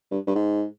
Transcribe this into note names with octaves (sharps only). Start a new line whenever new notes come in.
G2
G2
G#2